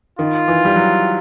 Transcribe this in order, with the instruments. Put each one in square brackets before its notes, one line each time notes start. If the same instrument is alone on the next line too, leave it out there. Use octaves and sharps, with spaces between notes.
[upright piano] D#3 [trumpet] F4
[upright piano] E3
G3
F#3